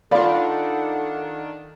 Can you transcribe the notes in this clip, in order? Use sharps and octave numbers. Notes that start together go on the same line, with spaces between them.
D#3 D4 F4 A4 D5 F5 F#5 B5